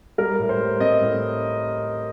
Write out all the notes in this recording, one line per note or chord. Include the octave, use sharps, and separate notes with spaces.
G3 A#4
A2
C5
G3
C4 D#5
A2